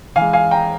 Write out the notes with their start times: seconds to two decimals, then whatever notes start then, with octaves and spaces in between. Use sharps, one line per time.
0.16 E3 F5 G#5
0.21 G#3
0.33 F5 G#5
0.51 G5 A#5